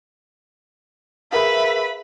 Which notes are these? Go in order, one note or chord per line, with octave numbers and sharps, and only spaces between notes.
G#4 A#4 B4 E5 F5 B5